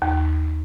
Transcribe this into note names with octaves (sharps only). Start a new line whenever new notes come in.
D#2